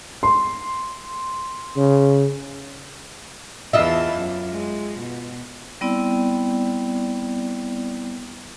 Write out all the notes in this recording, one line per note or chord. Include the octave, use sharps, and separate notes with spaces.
C6
C#3
E2 E3 F4 D#5 E5 A5
F#2
G#3
B2
G3 B3 C4 E4 D5